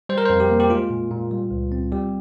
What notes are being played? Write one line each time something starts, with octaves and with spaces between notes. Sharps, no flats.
G3 C5
A#4
F2 C5
G4
A#3
G4
G#3 F4
A#2
A#2
G3
C#2
C4
G3 G4